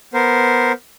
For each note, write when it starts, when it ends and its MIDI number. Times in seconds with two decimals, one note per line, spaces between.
0.14 0.72 59
0.14 0.72 70
0.14 0.72 72